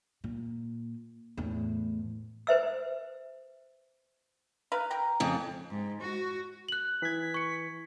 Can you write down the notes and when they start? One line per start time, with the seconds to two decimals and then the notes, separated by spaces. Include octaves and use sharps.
0.24 A#2
1.37 E2 A2
2.47 B4 C5 E5 E6
4.72 A#4 B4 F5
4.91 A#4 G5 A#5
5.20 F2 C#3
5.70 G#2
6.01 F#4
6.69 F#6 F#7
7.02 E3 G#6 B6
7.34 C#6 C#7